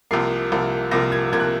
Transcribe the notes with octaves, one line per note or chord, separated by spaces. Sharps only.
C2 C3 F3 A#3 C7
C2 C3 F3 A#3
C2 C3 F3 A#3 A#6
G#6
C2 C3 F3 A#3 G#6
F#6